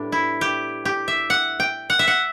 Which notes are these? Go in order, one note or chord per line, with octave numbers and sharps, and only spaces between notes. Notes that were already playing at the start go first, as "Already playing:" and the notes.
Already playing: A2 G3 B3 D4
E4
G4
G4
E5
F#5
G5
F#5
E5
F#5